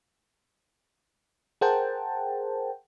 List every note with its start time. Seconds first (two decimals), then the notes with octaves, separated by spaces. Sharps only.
1.61 G#4 A#4 C5 F#5 G5 A5